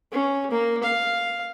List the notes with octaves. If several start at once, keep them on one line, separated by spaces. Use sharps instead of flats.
C#4
A#3
F5